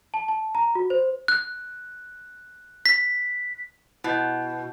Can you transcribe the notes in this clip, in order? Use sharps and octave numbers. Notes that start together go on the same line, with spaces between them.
A5
A5
A#5
F#4
C5
F#6
B6
B2 E4 D#5 G6